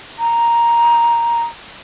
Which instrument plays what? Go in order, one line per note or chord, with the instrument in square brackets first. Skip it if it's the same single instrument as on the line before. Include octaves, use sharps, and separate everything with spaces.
[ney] A#5